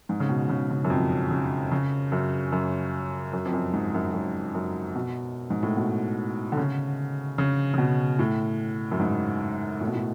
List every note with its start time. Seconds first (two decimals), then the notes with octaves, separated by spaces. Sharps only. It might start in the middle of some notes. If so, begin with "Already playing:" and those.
0.09 G#2
0.20 C#3
0.29 B2
0.49 C#3
0.70 C#3
0.85 F#2
0.90 F2
1.31 C#3
1.71 C#3
2.12 F#2
2.52 F#2
3.33 F#2
3.45 F2
3.53 F#2
3.73 G#2
3.94 F#2
4.13 F#2
4.54 F#2
4.95 B2
5.50 G#2
5.63 A2
5.76 B2
6.52 D3
6.57 C#3
7.38 C#3
7.74 C#3
7.78 B2
8.19 A2
8.91 F#2
8.99 G#2
9.81 A2
9.87 B2
9.95 A2